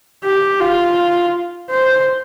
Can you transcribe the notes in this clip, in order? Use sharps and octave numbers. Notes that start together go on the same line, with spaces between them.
G4
F4
C5